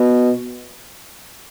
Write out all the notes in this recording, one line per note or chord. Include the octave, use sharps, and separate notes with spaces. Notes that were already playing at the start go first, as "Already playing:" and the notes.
Already playing: B2